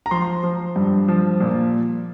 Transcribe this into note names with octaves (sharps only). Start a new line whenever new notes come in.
A#5
F3 C6
F3
G2
F3
A#2